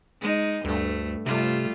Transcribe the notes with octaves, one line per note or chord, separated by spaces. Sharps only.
G#3 D#4
D2 G2 A3
C3 G3 A3 F4